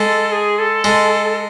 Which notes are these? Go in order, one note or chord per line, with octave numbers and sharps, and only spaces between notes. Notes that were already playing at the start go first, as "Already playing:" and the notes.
Already playing: G#3 A4
G#4
A4
G#3